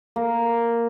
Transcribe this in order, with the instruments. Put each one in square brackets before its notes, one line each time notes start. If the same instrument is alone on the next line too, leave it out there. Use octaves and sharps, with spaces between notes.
[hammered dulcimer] A#3